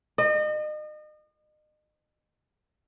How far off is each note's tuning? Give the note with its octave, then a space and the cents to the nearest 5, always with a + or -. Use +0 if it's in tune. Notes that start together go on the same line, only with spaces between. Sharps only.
D#5 -35